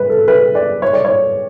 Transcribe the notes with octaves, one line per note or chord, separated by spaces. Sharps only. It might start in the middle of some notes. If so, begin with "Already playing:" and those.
Already playing: B4
A4
B4
D5
C#5
D5
C#5